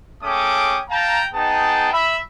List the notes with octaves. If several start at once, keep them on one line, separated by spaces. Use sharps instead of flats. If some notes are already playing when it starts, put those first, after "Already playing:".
A3 C#4 G#4 G5 D6 D#6
F5 G5 A5 A#5
B3 D#4 G#4 G5 A5
E5 B5